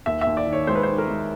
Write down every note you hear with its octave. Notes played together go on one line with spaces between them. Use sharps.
D#2 E5
E5
D#2
D5
D#3
C#5
G#3 C5
B4
D#3 C5
A#4
G#3